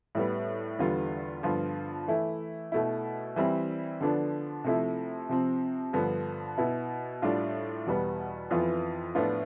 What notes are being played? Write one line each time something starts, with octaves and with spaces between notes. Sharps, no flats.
A2 G3 B3
E2 D3 G3 B3 F4
G2 D3 F3 B3 F4
E3 A3 E4
B2 A3 E4
E3 G3 C4 E4
D3 F3 B3 D4
C3 F3 A3 E4
C3 F3 C4
G2 D3 F3 B3
B2 B3 E4
A2 G3 D4 F4
E2 B2 G3 B3
F2 E3 B3 F4
A2 F3 B3 D4 F4